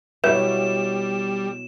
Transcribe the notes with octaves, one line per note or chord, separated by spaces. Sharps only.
B2 F#3 G3 E4 B4 E5 G6 E7